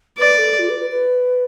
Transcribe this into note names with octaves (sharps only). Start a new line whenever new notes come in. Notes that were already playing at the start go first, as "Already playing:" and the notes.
B4 D5
A4
F4
B4
B4
B4